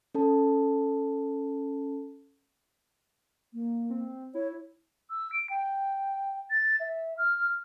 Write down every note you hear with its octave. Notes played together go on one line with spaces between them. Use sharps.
C#4 A4 A5
A#3
C4
E4 C#5
E6
D7
G5
A6
E5
F6